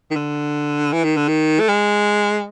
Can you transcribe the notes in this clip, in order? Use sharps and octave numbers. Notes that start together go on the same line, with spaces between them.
D#3
D3
E3
D#3
D3
D#3
A3
G#3